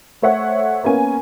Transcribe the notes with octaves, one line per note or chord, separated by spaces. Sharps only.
A3 C5 C#5 E5 F#5
A#3 B3 C#4 A#4 G#5